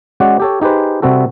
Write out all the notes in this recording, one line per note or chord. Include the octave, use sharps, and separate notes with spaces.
G#3 C#4 F#4 D5 F#5
G4 A4 C#5
D#4 G4 G#4 B4 C5
C3 G3 C4 F#4 A4